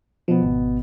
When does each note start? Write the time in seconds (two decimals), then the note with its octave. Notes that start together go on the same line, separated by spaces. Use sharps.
0.28 B2 F3 B3
0.43 G#1